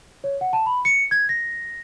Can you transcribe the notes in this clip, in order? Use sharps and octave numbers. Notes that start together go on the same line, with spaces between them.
C#5
F#5
A5
B5
C#7
G#6
A#6